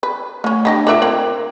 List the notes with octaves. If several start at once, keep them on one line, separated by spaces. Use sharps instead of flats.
B4
A3 A#3 C#4
B3 D4 F#4 G4 D#5
D3 F4 A#4 E5 D6
A#3 C4 A#4 G5